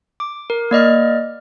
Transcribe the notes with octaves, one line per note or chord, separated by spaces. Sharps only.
D6
A#4
A#3 D5 D#5 F6